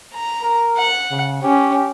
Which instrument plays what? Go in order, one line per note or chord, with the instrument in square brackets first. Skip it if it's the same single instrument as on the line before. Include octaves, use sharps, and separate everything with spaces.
[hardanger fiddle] A#5
[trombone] A#4
[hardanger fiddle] F#5
[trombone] C#3
[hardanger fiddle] C#4 [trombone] G4